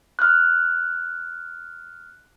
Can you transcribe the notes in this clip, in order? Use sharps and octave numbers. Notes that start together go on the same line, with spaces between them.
F6 F#6